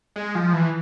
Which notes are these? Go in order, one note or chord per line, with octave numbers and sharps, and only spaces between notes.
G#3
F3
E3